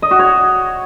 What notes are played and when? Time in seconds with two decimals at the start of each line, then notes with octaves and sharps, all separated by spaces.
0.02 D#5
0.11 F#4
0.19 C#5